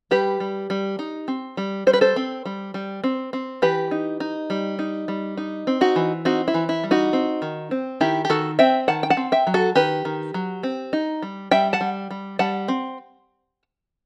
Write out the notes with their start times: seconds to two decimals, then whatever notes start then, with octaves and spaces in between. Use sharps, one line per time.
0.11 G3 G4 B4
0.40 G3
0.70 G3
0.99 D#4
1.28 C4
1.57 G3
1.87 G3 C5
1.93 B4
2.01 A4 C5
2.16 C4
2.46 G3
2.74 G3
3.04 C4
3.33 C4
3.62 E3 G4 B4
3.91 D#4
4.20 D#4
4.50 G3
4.79 D#4
5.08 G3
5.37 D#4
5.67 C4
5.81 D#4 F#4
5.96 E3
6.25 C4 D#4 F#4
6.48 E4
6.54 E3
6.69 E4
6.84 G3
6.91 D#4 F#4
7.13 C4
7.42 D#3
7.71 C4
8.01 D#3 E4 G4
8.25 G4
8.30 D#3 F#4 A4
8.59 C4 E5 G5
8.88 D#3 F#5 A5
9.03 G5
9.10 F#5 A5
9.17 C4
9.32 E5 G5
9.47 F#3
9.54 F#4 A4
9.76 D#3 G4 B4
10.05 D#3
10.34 F#3
10.63 C4
10.93 D#4
11.22 G3
11.51 G3 E5 G5
11.73 F#5 A5
11.81 G3
12.11 G3
12.39 G3 F#5 A5
12.68 C4